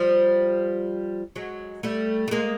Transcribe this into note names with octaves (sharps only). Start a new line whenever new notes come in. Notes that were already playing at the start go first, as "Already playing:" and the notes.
Already playing: F3 G3
F#3 G#3
G3 A3
A3
G#3 A#3